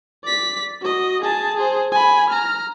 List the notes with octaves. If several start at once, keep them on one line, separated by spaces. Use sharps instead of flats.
D5 B6
F#4 D#5
G#4 A5
G#4 C5
G#5 B5
A#5 F6